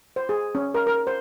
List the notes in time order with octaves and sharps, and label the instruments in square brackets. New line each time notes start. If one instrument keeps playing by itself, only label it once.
[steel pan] C5
G#4
C#4
A#4
A#4
C5